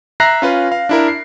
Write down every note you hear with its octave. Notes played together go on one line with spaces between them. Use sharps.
E5 A#5 F#6 A#6 C7
C#4 F4 B4
F5
D4 E4 A#4
C7